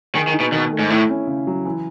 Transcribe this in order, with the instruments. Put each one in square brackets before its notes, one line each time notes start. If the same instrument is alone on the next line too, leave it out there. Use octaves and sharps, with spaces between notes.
[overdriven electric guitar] D#3 [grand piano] G#4
[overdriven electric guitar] D#3
[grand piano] D#4
[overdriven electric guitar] B2
[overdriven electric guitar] B2 [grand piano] D#3
[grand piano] A3
[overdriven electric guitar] G#2
[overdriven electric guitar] A2 [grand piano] E4
[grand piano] C#4
C#3
F#3
E3